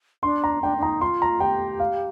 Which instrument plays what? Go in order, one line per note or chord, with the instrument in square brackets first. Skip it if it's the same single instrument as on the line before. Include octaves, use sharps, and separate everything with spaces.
[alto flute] D4 [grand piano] C6
[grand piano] A#5
[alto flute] D4 [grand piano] G5
[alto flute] D4
[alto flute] D#4 [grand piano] A#5
[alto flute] F4 [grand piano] C6
[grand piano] A#5
[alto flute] G4 [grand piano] G5
[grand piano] F5